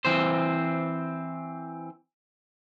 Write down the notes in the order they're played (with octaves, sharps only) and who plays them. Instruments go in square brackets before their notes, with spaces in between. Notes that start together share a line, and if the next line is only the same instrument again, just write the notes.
[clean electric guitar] E3 C4 C5